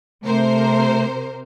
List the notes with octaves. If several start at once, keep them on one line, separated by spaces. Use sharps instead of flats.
C3 A3 A#4 C5